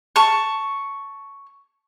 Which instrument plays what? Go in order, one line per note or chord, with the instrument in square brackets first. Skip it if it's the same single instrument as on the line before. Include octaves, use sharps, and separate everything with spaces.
[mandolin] A5 C#6